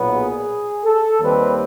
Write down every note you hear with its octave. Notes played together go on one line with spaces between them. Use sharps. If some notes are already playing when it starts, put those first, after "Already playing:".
Already playing: B1 A#2 F#3 B3
G#4
A4
D#2 D#3 G3 C4 B4